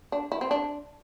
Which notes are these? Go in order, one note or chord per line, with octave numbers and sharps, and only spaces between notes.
D4
E4
C4
D4